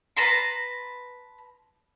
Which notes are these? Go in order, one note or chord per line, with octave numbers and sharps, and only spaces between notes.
B4 A5 A#5 C6